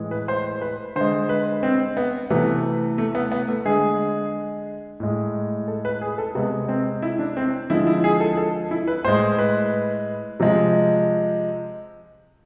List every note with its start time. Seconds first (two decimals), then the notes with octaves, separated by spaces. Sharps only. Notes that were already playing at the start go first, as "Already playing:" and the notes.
Already playing: A2 E3 G#3
0.11 B4
0.28 C5
0.61 B4
0.96 D3 G#3 C5
1.29 B4
1.63 C4
1.97 B3
2.30 C3 E3 A3 B3
2.98 A3
3.15 B3
3.32 B3
3.48 A3
3.65 D3 G#3 G#4
5.00 A2 G#3
5.68 A4
5.85 B4
6.01 G#4
6.18 A4
6.35 C3 G#3 B3
6.69 C4
7.02 E4
7.19 D4
7.37 C4
7.70 D3 F3 G#3 E4
7.87 E4
8.04 G#4
8.20 A4
8.37 A4
8.71 E4
8.87 B4
9.04 A2 G#3 C5
9.39 B4
10.40 C3 F3 G#3